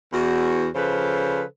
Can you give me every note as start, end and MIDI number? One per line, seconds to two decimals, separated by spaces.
0.13 0.67 40
0.13 0.67 66
0.75 1.43 49
0.75 1.43 53
0.75 1.43 69
0.75 1.43 71
0.75 1.43 72